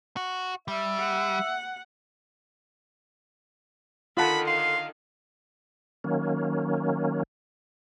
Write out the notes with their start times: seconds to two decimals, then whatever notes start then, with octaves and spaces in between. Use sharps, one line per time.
0.17 F#4
0.68 G3 E5
0.99 F#5
4.17 D3 D#3 F4 F#5 A5 B5
4.46 F5 C6
6.04 D#3 F#3 A#3 C#4